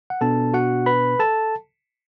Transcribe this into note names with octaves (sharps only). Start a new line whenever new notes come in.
F#5
B2 B3 D4 A4 A5
F#4 F#5
B4 B5
A4 A5